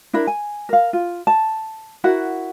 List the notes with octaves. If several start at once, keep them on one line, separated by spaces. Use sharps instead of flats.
D4 E4 A#4 B5
G#5
A#4 F5
F4
A5
E4 F#4 A#4 F#5